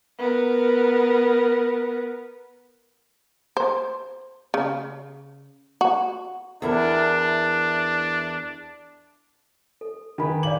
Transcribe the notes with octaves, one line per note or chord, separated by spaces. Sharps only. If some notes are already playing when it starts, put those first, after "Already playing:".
B3 A#4
C5
C#3
F#4
E2 D4 E4 A#4
A4
D#3 G#4 B4
D5 F5 D6 F#7